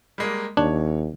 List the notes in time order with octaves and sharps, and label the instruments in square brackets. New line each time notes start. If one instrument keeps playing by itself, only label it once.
[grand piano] G3 G#3 A#3
[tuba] D#2 [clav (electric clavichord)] D4 [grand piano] C#5